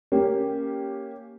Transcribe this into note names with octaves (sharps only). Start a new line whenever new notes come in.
A#3 C#4 G4